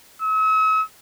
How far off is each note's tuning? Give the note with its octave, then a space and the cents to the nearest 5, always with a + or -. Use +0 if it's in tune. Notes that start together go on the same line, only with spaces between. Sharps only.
E6 -45